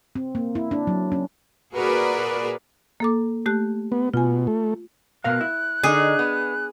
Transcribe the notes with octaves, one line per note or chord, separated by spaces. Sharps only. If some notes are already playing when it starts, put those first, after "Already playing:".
C4
A#3
E4
D4
F#3
C#4
A#2 F#4 G#4 A#4 B4 D5
A#3 A4 D6
A3 G4 F#6
B3
B2 F4 G#5
A3
B2 A#4 F5 F#6
E4
D3 D#4 G#4
B3